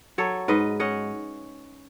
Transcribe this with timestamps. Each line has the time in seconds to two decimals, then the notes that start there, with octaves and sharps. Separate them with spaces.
0.18 F#3 A4 C#5
0.48 G#2 B4 D#5
0.80 C#4 D#5 F#5